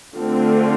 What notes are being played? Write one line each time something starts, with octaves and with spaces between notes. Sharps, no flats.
D3 A3 C4 F4